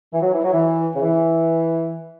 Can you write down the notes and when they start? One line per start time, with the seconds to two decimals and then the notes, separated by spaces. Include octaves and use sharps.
0.12 E3
0.22 F#3
0.33 E3
0.44 F#3
0.53 E3
0.96 C#3
1.02 E3